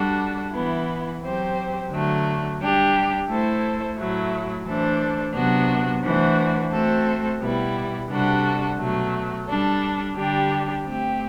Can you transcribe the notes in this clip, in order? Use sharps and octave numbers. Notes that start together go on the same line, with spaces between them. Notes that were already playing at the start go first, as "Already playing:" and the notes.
Already playing: G3 D4 F#4 A4
E3 B3 E4
F#3 C4 G4 C5
D3 F#3 A3
G3 D4 G4
A3 E4 A4 C5
A2 F#3 A3 E4
E3 A3 D4 A4 C5
C3 F#3 B3 D4 F#4
E3 A3 D4 F#4 C5
A3 C4 F#4 A4 C5
B2 G3 B3 E4
C3 G3 D4 F#4 A4
B2 F#3 A3
G3 D4 A4
D3 G3 D4 G4
A3 C4 G4